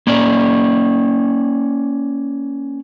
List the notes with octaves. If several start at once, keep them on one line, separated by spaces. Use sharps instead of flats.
A#3 C#4 D5